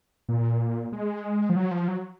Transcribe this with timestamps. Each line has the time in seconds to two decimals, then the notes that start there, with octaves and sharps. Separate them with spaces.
0.29 A#2
0.93 G#3
1.50 F3
1.56 F#3
1.71 F3
1.88 F#3